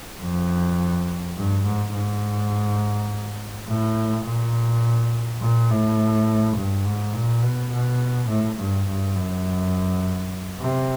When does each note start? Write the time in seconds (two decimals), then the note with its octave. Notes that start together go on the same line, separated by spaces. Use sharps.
0.21 F2
1.37 G2
1.65 G#2
1.94 G#2
3.68 A2
4.25 A#2
5.41 A#2
5.70 A2
6.57 G2
6.85 G#2
7.14 A#2
7.43 B2
7.72 B2
8.29 A2
8.59 G2
8.88 G2
9.16 F#2
10.61 C3